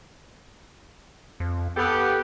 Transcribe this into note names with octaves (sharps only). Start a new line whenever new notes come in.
F2
B3 G4 A4